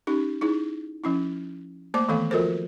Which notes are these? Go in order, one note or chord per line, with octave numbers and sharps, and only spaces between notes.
C#4 D#4 G4
D#4 E4 G#4
F3 C#4 E4
A3 A#3 C5 D5 D6
D#3 E3 A3 B3 A4 F5
F3 F4 F#4 A4 A#4 C5